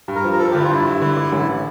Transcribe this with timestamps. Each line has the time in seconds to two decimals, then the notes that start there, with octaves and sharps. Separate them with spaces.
0.08 G2
0.15 A#4
0.24 F3
0.33 A#4
0.39 F3 A4
0.51 G4
0.55 D3 E4
0.63 F4
0.70 G2 E4
0.86 G2
1.02 D3
1.17 D3
1.33 A1